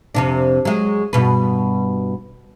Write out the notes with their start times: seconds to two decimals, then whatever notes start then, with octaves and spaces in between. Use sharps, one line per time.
0.15 F2 C3 D4
0.65 F#3 G#3
1.13 G2 B2 B4